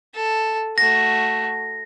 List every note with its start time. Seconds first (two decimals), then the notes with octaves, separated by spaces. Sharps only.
0.15 A4
0.78 A3 F#4 A#6